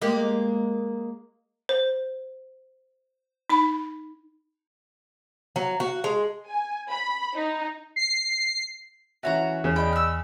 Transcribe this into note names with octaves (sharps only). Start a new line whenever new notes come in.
G#3 A#3 G4
C5
D#4 B5
F#3
F#4
G#3
G#5
B5
D#4
C7
E3 C#4 F#4 C#5 E5 A#5
E2 C#3 E7
D5 D#5 G5 B5
E6 F6